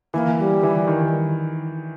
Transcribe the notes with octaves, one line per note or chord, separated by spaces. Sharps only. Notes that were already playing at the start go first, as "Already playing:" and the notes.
E3 A#3
G3
E3
D#3